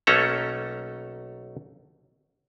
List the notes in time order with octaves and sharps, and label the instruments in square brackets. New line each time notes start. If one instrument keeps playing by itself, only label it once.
[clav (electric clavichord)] B1 A3 A#3 C#4 A4 A#5